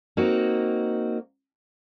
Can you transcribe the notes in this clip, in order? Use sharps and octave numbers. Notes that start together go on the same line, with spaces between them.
A#3 C4 D#4 F#4